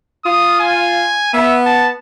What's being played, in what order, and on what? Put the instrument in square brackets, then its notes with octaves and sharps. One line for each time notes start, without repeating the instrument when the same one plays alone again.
[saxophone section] F4 [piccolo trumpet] D#6
[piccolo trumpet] G#5
[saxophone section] B3 [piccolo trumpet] E5
[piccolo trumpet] A5